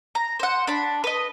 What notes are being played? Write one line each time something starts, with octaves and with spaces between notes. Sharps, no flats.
A#5
C5 F#5
D4 B5
B4 D#5